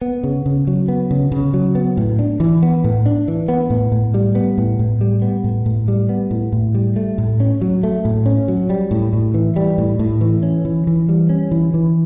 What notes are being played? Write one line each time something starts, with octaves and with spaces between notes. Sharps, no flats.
B3
C#3
C#3
F#3
B3
C#3
C#3
F#3
B3
A2
D4
E3
B3
A2
D4
E3
B3
A2
A2
G3
B3
A2
A2
G3
B3
A2
A2
G3
B3
A2
A2
G3
A3
A2
C#4
F#3
A3
A2
C#4
F#3
G3
A2
A2
E3
G3
A2
A2
E3
C#4
E3
E3
G3
C#4
E3
E3